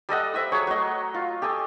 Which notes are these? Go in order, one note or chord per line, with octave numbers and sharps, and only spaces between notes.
G3 A4 D#5 F#5
C5 E5 D#6 E6
F#3 G#4 C#5
F#3 A3 D#5
F4
G4 A4 G#5 D#6